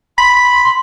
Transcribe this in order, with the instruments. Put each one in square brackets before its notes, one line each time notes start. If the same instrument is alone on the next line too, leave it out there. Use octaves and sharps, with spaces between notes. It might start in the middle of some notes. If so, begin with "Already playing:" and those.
[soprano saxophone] B5 [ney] C6